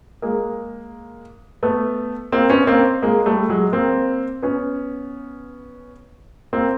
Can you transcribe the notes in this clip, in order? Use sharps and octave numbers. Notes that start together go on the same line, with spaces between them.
G#3 A#3
A3 B3
A#3 C4
B3 C#4
A#3 C4
G#3 A#3
G3 A3
F#3 G#3
A#3 C4
B3 C#4
A#3 C4